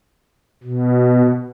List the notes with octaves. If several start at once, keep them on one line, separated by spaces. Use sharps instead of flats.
B2